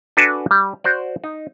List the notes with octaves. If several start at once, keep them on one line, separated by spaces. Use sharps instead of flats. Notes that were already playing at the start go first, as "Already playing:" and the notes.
D4 F#4 A4 B4 G#5 A5
G3
F#4 C5 D5
D#4